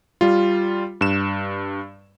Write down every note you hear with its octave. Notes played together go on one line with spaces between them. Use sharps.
G3 F4
G2 E7